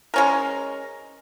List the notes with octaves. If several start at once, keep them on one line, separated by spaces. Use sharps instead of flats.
G#3 C#4 A#4